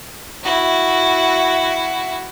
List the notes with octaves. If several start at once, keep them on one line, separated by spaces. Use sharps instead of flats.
E4 F#4